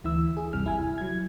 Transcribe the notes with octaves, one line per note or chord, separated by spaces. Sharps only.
D2 E3 E4 E6
G#4
G1 D#2 C3 G3 F6
E4 G#5
F#3 G#6